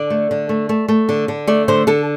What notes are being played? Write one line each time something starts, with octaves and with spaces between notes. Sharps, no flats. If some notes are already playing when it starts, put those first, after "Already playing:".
Already playing: D3 D5
A3
D3
A3
A3
A3
D3
D3
A3 D5
D3 C5
D3 A4